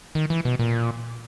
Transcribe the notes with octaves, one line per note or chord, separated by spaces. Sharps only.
D#3
E3
B2
A#2